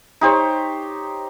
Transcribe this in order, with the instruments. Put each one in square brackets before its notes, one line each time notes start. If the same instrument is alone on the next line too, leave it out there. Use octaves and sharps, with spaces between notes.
[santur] D#4 G4 C5 C#5